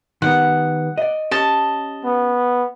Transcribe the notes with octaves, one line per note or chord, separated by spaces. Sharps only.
D#3 G3 B3 F#5
D5 D#5
C#4 G4 D#5 A5
B3